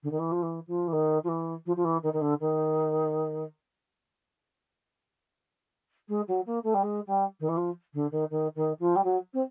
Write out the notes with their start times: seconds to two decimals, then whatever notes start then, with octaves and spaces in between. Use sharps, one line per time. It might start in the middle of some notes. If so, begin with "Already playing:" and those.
0.03 D3
0.11 D#3
0.19 E3
0.32 F3
0.42 E3
0.67 F3
0.87 E3
0.92 D#3
1.24 F3
1.28 E3
1.66 F3
1.76 F3
1.84 E3
2.03 D#3
2.13 D#3
2.21 D3
2.40 D#3
6.08 G#3
6.28 F#3
6.46 A#3
6.63 A3
6.74 G3
6.83 G#3
7.07 G3
7.40 D#3
7.48 E3
7.57 F3
7.94 D3
8.11 D#3
8.30 D#3
8.55 D#3
8.79 F3
8.96 G3
9.04 F#3
9.33 C4